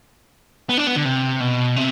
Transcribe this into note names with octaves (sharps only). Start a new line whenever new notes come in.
B3
D4
B3
D3
C3
B2
C3